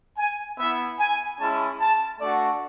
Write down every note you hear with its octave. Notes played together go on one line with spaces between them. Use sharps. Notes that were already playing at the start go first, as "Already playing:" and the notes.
G#5
B3 E4 E5
G#5
G#3 C#4 E4 A5
A5
A3 D4 F#4 D5